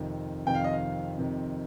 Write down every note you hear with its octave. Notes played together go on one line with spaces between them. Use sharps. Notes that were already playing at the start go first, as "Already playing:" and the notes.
Already playing: F2 C3 D#3
F2 C3 D#3 G5
F5
D#5
F5
F2 C3 D#3